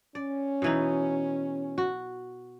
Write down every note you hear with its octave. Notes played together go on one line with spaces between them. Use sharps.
C#4 D5
B2 E3 D#4
F#4